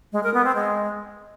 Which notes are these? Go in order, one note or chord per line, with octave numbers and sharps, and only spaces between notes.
G#3
A#4
B3
C4
G#3